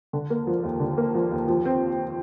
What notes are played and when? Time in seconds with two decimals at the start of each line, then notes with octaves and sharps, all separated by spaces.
0.13 D3
0.30 A#3
0.47 F3
0.63 D#2
0.80 D3
0.97 A#3
1.15 F3
1.31 D#2
1.48 F3
1.65 C4